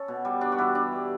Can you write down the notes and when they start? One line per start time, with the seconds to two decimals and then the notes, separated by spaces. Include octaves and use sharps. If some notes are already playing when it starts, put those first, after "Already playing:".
Already playing: C#4 A4
0.08 B2
0.25 G3
0.41 G2 D4
0.52 F#4
0.58 E3 G3 E4
0.75 G2 D4
0.92 E3 G3